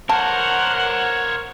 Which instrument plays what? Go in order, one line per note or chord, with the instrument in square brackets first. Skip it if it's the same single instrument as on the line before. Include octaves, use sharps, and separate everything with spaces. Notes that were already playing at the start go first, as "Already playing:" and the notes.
[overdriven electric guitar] A#4 [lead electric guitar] C5 C#5 [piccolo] F#5 [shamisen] A5